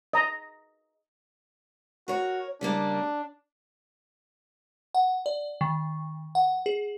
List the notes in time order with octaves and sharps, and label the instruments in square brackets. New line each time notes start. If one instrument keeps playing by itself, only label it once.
[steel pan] D#5 A#5
[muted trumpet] F#4 [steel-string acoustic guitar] A#4 C#5
[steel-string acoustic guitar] C#3 G3 A#3 [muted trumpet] D4
[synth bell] F#5
D5
D#3
F#5
G#4